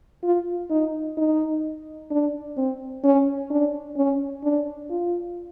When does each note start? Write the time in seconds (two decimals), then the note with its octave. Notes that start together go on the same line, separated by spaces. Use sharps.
0.24 F4
0.71 D#4
1.17 D#4
2.11 D4
2.57 C4
3.04 C#4
3.51 D4
3.97 C#4
4.44 D4
4.90 F4